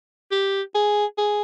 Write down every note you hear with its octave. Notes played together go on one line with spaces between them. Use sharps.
G4
G#4
G#4